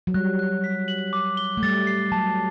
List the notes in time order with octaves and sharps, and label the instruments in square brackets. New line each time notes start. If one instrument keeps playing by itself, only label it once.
[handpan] F#3
[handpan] G3 [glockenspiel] F#6
[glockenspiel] F#6
B6
F#7
D6
G7
[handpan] A3
[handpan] G3 [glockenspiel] A6
[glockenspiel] C7
[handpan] F#3 [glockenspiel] A5